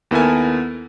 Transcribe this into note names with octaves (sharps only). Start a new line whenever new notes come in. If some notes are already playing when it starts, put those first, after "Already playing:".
D#2 B3 E4 A4 A#4 G#5